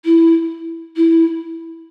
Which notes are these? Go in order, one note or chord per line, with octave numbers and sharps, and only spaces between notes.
E4
E4